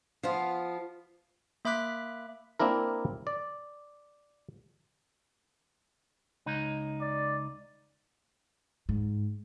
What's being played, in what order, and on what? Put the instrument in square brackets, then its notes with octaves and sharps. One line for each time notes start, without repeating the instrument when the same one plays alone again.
[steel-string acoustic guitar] F3 B3 F4
[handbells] A#3 E5 B5 D6 F#6 B6
[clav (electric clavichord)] A#3 C4 D4 E4 A#4
D5
[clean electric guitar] C#2 D#4
[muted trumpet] D5
[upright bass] G#2